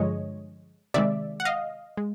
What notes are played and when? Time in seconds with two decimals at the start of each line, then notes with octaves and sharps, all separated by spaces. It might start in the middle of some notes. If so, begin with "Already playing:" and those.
Already playing: G2 D3 F3 G#3 C#5 D#5
0.94 C3 D#3 G#3 D5 E5
1.40 F#5
1.45 D#5 F5
1.97 G#3